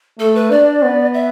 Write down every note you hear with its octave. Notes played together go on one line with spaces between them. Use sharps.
A3 A4
B4
D4 D5
B3
E5